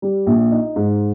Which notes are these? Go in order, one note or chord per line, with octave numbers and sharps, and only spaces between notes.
G3
A#1
D#4
G#2